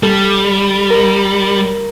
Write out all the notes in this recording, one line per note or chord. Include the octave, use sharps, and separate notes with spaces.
G3 A4
A#4